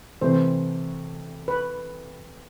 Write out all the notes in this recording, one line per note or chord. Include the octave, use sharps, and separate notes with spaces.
C3 E3 A3 C5
B4